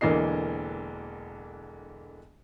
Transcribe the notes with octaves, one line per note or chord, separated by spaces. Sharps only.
E1 D3 E3 A#3 D#5 C7